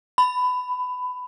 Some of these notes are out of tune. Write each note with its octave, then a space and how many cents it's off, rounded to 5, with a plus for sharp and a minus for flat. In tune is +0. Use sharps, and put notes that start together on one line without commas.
B5 +20